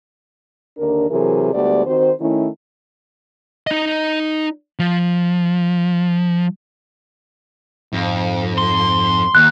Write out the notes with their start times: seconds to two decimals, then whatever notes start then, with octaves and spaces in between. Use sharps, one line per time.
0.78 D#2 D3 D4 A#4
1.10 C3 E3 F#3 G#4 A#4
1.54 D2 G3 G#3 B3 G4 D5
1.86 D#3 C4 F#4 C5
2.21 D#3 A3 C#4 E4
3.67 D#4 D#5
4.79 F3
7.93 F2 G#2
8.58 C6
9.35 D#2 F#6